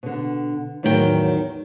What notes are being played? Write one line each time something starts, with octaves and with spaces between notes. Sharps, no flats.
B2 D3
E2 A2 D#3 F#3 A4 G5